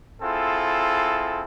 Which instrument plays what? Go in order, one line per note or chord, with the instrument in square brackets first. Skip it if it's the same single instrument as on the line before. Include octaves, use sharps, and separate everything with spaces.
[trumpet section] C4 E4 F4 G#4 A4